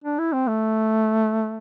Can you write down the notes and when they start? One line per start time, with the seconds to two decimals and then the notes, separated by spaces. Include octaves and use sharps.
0.04 D4
0.19 E4
0.33 C4
0.48 A3